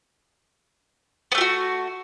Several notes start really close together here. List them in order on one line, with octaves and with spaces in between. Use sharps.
B3 A3 G4 F#4